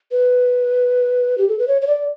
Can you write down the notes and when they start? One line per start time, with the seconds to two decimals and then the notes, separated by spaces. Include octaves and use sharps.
0.12 B4
1.38 G4
1.49 A4
1.59 B4
1.68 C#5
1.82 C#5
1.87 D5